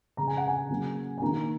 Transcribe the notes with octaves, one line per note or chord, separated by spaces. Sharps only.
C#3 G#3 A#5
G#5
F#5
G#5
C#3 F#3 A#3
G#5
D#3 A#3 A#5